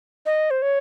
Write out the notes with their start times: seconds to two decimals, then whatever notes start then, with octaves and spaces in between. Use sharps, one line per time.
0.26 D#5
0.51 C5
0.62 C#5